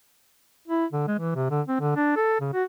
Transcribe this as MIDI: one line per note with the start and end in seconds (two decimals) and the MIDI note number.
0.68 0.85 64
0.92 1.03 50
1.07 1.14 56
1.19 1.35 52
1.35 1.45 48
1.50 1.61 50
1.68 1.79 60
1.80 1.92 50
1.96 2.14 62
2.16 2.39 69
2.40 2.49 49
2.53 2.63 66